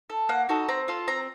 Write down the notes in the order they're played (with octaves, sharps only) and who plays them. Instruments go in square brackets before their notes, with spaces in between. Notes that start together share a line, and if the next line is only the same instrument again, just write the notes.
[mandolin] A4
A#3 F#5
D#4 F#4 A4
C4 A#5
F4 A4
C4 A#5